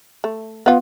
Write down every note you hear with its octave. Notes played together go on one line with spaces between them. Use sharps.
A3
B3 F4